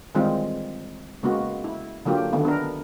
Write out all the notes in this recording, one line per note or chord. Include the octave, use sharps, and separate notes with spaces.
D#3 E3 G3 G#3 C4 F4
C#3 G#3 A#3 B3 F#4
E4
D3 F#3 A#3 F4 G4
D3 D#3 A3 B3
B3 D4 A#4